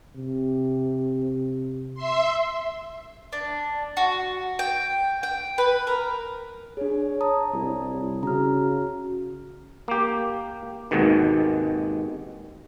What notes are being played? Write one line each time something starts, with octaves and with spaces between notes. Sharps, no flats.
C3
E5 C6
D4
F#4
G5
G5
B4
A#4
D4 G#4 C#5
A5 A#5 D#6
C2 E4
C#3 F#4 A#5 F6
A#3 G4
G#1 D#2 G#2 B2 D#3